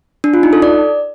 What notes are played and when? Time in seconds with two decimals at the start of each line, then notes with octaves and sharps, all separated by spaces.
0.24 D4
0.34 F4
0.43 D#4
0.53 A4
0.62 D5